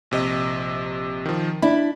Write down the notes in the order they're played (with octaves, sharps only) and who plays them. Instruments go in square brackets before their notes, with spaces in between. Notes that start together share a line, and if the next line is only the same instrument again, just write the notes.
[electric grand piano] A#1 C3 D#5
D#3 F3
[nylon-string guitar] D4 E4 [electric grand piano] B5